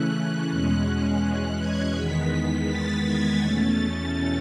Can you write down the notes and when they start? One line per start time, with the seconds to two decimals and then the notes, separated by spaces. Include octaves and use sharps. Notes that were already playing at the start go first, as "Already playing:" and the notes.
Already playing: C#3 E3 A3 C#4 F#6
0.13 F#6
0.49 E2 B2 G#3 C#4
0.85 F#6
1.58 G#6
1.94 E2 D#3 G#3 B3 B6
2.68 A6
3.05 G#6
3.40 E2 B2 A3 C#4 A6
3.77 A6